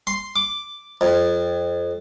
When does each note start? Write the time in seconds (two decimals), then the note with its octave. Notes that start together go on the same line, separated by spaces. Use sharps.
0.07 C6
0.36 D6
1.01 F2